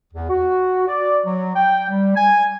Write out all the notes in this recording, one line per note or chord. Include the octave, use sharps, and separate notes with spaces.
E2
F#4
D5
F#3
G5
G3
G#5